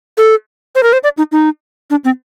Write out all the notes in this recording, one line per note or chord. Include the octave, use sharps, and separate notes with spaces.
A4
C5
A#4
C5
D5
D#4
D#4
D4
C4